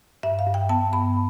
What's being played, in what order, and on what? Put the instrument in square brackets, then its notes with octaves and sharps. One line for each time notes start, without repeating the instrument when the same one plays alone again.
[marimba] G2 E5
F5
G2
G5
B3 A5
G2 B5